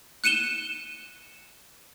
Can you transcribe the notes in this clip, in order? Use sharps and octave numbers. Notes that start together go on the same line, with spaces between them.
F#6 C#7 D#7 E7 G7